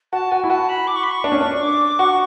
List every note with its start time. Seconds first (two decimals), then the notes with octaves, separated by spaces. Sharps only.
0.12 F#4 A5
0.31 F#4 G#5
0.44 E4
0.50 F#4 A5
0.69 B5
0.87 D6
0.95 C#6
1.03 B5
1.11 C#6
1.24 D4
1.32 C#4
1.41 D4
1.62 D6
1.99 F#4 C#6